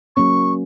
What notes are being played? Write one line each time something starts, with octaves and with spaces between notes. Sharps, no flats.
F#3 A#3 C#4 C#6